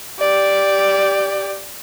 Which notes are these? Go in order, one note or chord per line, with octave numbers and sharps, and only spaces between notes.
G4 D5